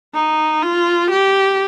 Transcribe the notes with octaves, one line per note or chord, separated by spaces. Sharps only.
D#4
F4
G4